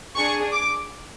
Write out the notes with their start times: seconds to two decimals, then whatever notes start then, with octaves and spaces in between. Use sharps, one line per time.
0.17 D4 G#4 C#6
0.54 D6